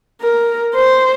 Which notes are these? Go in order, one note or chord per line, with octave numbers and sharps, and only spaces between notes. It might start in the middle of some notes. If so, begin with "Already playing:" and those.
A#4
C5